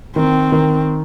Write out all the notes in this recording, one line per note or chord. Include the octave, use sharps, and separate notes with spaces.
D#3 C4
D#3